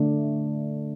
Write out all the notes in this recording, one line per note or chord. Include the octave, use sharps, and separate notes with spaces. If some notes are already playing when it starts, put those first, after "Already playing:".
Already playing: D3 A3 D4